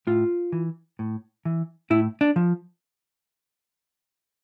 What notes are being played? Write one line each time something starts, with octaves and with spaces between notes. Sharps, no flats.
A2 F4
E3
A2
E3
A2 E4
D4
F3